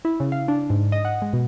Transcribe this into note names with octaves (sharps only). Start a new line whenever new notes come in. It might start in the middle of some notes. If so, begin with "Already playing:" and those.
E4
C#3
F5
D4
G#2
D#5
F#5
G#3
B2